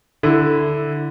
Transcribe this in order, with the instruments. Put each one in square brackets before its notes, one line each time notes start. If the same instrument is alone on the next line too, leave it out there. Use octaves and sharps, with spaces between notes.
[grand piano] D3 E4